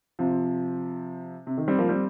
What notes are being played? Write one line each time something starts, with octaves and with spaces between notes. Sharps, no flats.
C3 F3
C3
D#3
G3 C4
F3 A#3
G3 C4